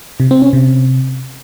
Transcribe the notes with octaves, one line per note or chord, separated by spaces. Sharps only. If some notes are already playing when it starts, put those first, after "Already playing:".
C3
C4
C#4
C3